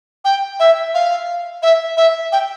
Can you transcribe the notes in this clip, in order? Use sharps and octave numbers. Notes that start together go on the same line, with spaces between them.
G5
E5
F5
E5
E5
G5